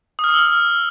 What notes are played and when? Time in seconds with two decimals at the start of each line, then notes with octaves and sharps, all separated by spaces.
0.19 D#6
0.24 F6
0.29 D#6
0.34 E6
0.39 F6